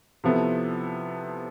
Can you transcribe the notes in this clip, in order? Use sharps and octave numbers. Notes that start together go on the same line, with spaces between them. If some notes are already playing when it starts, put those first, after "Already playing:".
C3 F3 B3 E4 A4